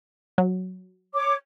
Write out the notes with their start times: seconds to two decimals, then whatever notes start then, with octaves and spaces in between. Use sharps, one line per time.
0.38 F#3
1.14 C#5 D6